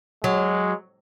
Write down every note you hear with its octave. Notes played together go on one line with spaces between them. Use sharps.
F#3 G#3